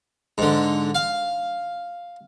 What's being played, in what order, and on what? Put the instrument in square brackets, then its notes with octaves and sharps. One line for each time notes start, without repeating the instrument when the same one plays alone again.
[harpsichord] G#2 D3
F5